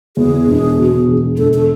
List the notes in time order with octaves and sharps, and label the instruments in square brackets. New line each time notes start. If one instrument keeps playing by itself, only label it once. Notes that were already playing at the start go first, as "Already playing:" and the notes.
[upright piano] E2 [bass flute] G#4
[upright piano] E1
B2
E1
[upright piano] E1 [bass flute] A4
[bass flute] A4